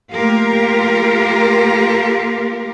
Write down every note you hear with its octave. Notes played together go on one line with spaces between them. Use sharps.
A3 A#3 F4 G4 A#4 F5